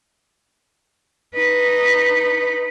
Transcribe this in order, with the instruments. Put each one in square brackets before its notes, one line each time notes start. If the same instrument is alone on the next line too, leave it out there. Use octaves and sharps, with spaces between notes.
[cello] D#4 B4